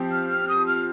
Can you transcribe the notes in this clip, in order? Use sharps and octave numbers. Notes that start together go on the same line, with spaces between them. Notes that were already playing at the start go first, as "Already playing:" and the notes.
Already playing: F3 C4 G4
F6
F6
D#6
F6